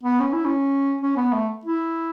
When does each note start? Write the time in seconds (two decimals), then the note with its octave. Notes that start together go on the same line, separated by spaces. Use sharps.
0.03 B3
0.20 C#4
0.32 E4
0.45 C#4
1.01 C#4
1.17 B3
1.33 A3
1.65 E4